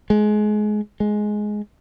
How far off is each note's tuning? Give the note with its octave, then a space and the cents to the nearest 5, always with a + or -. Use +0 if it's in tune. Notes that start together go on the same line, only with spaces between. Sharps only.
G#3 +25
G#3 +10